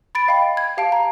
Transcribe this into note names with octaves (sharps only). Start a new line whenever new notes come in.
B5 A6 D7
D#5 F5 G5 B5
G#6
G4 F5 A5 D7
A#5